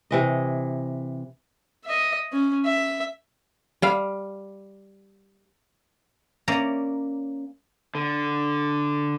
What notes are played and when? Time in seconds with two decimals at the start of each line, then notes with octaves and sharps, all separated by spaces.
0.11 C3 E3 D#5
1.85 D#5 E5
2.32 C#4
2.65 E5
3.82 G3 F5
6.48 A#3 C#4 D5 E5 A#5
7.95 D3